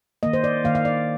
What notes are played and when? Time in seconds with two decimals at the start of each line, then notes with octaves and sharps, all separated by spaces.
0.23 D#3 A#3 D#5
0.33 C5
0.44 D5
0.64 D#3 A#3 F5
0.75 F5
0.85 D5